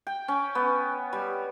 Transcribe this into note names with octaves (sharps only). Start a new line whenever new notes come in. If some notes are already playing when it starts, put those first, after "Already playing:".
G5
C#4
B3
G3